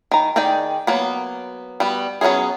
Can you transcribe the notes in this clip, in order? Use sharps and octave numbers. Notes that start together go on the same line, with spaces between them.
D#3 A#5
D#3 D#4 G#4 D5 G5
F#3 A#3 B3
G3 B3 F#4
F#3 B3 C#4 E4 G#4